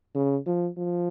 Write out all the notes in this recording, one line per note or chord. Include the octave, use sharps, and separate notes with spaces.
C#3
F3
F3